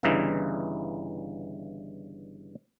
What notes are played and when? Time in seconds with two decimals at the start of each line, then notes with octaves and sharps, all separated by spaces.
0.03 G1 G2 C#3 E3 D#4 E4